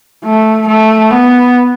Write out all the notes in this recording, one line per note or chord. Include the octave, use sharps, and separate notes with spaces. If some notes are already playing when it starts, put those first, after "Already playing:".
A3
A3
B3